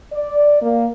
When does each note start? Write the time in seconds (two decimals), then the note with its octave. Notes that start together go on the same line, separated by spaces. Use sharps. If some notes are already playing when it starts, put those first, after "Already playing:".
0.13 D5
0.61 A#3